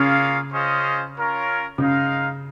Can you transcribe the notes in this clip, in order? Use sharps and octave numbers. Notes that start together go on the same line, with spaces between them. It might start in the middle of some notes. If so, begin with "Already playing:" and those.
Already playing: C#3 A#3 F4 G#4 C#5 F5
C#4 F4 G#4 C5 D#5
C#4 F4 A#4 C#5
C#3 G#3 D#4 A#4 F5